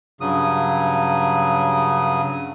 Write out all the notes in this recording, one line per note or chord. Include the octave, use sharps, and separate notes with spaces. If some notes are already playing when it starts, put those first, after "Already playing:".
G2 C#3 F#3 D#6